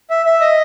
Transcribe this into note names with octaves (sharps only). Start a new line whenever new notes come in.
E5
E5
D#5